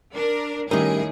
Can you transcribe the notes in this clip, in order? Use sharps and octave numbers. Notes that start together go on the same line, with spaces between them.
D4 A#4
A2 D#3 G3 C#4 D#4 G4 G#4 A#4